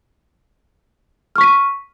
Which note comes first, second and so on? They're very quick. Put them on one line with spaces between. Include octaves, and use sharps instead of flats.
F6 C#6 B6 D#7